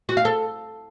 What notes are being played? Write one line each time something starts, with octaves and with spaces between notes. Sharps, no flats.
F#4
F5
A4